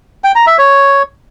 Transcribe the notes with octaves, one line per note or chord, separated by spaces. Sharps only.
G5
A#5
E5
C#5